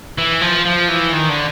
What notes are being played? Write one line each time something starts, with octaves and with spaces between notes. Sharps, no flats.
E3
F3
F3
E3
D#3
D3